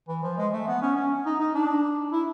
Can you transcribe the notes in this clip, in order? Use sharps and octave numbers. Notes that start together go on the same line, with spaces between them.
E3
F3
G#3
A3
B3
C#4
C#4
D#4
D#4
D4
E4